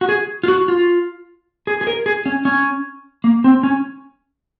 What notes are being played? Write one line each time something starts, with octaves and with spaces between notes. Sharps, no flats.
F#4
G#4
F4
F#4
F4
G#4
G#4
A#4
G#4
C#4
C#4
A#3
C4
C#4